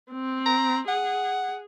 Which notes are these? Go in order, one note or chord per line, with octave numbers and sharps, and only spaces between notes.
C4
A#5
G#4 F#5